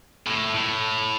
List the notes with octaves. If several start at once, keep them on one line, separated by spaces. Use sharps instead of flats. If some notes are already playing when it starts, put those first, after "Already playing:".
A2
A2